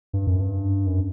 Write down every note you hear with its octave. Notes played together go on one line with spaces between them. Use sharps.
G2
F#2
G2
F#2